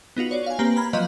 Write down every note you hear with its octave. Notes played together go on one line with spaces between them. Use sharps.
B3 D#4 F4 F#4
C#5 D5
F5 G#5
A#3 C4 G4 B4 A#5
A#5 B5 F6 G#6
F3 F#3 B4 D#5 F5 G6